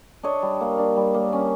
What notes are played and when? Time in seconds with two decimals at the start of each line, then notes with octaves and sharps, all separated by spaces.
0.23 D4 C#5 D#5
0.42 G3
0.61 A#3
0.78 D4
0.97 G3
1.14 A#3
1.33 C#4